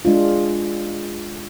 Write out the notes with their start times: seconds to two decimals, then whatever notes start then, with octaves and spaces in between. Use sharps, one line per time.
0.05 G#3 D4 F4